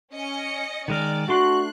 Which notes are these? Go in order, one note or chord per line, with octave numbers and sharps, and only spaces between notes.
C#4 D#5 C#7
D#3 G#3 A#4 D5
A3 D4 F#4 C6 F#6